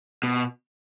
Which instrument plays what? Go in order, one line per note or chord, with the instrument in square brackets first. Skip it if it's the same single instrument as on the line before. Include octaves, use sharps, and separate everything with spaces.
[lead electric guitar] B2